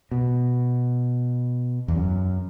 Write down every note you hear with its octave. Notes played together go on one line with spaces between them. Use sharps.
B2
E2
F#2